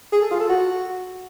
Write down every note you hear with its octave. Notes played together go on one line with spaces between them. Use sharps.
G#4
A4
F4
A4
F#4